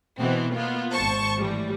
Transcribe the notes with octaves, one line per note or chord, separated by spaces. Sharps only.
B2 E3 B3 C4
A#3 B3 F4
G#1 C5 A5 C#6
A2 E3 G3